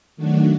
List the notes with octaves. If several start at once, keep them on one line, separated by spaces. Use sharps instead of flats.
D#3 F#3 A3 D4 F#4